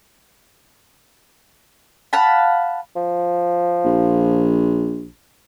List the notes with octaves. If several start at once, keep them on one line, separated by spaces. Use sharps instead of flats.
F5 F#5 A5 B5
F3
A#1